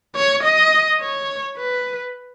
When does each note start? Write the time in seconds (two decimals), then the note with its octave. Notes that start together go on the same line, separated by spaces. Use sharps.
0.16 C#5
0.44 D#5
1.00 C#5
1.57 B4